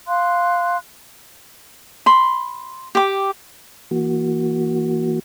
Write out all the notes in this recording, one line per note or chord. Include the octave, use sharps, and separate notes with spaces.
F5 C6 F#6
B5 C6
G4 D6
E3 A#3 F#4